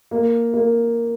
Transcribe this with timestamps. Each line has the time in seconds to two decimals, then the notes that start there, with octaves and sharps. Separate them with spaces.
0.11 A#3
0.54 A#3